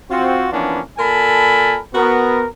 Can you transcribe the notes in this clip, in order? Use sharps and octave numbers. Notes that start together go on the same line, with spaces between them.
C4 F4 F#4
E3 F3 A#3 B3 C#4 D4
A#2 A4 A#4 G#5 A5 B5
B3 F#4 A#4